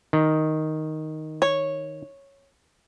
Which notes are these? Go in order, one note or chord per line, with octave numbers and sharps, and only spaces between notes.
D#3
C#5